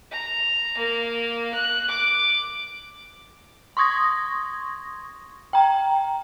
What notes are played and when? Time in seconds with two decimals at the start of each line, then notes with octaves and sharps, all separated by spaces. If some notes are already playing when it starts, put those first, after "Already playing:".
0.11 A#5
0.78 A#3
1.54 F#6
1.88 D6
3.77 C6 C#6 D#6 G#6 A#6
5.53 G5 A#5